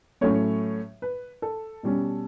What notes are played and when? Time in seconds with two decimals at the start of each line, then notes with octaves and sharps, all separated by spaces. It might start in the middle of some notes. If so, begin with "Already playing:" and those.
0.21 A2 F#3 A3 C#4 C#5
1.02 B4
1.42 A4
1.83 B2 G3 C#4